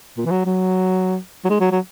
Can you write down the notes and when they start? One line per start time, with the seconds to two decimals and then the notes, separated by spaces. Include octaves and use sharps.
0.17 A#2
0.25 E3
0.31 F#3
0.46 F#3
1.44 F#3
1.50 G#3
1.60 F#3
1.72 F#3